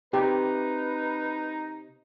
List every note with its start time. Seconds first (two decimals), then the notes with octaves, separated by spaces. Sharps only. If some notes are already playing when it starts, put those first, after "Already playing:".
0.13 C3 D#4 G4 B4